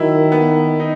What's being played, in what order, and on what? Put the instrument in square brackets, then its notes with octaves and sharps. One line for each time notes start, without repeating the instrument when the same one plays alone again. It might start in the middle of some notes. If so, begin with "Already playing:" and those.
Already playing: [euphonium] D#3 [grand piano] F#3 E4
[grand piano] B3
D#4